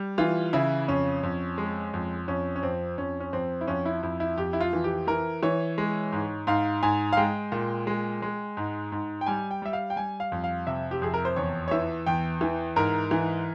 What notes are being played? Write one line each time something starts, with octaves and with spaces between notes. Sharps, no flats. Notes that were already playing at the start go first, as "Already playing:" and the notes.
Already playing: G3
E3 F4
C#3 E4
F2 C#4
F2
G#3
F2
F2 C#4
C#4
F2 C4
F2 C#4
C#4
F2 C4
E4
F2 C#4
E4
F2 E4
E4
F2 G4
E4
F4
E3
G4
E3 A#4
E3 C#5
G#3
G#2
G#2 F5
G#2 G#5
F5
G#3 G5
A#2
G#3
G#3
G#2
G#2
G5
G3 G#5
G5
G3 E5
F5
G5
G3 G#5
F5
F2
F5
C3 E5
G4
F2 G#4
A#4
C5
E2 C#5
C#5
E3 E5
E2 G5
E3
G#2 A#4
E3